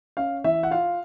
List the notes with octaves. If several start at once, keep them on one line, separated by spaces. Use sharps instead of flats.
C#4 F5
E3 E5
F#5
F4 F5